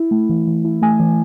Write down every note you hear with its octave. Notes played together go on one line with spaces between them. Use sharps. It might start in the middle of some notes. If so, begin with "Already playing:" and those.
Already playing: E4
A3
E3
E3
E4
A3 G#5
E3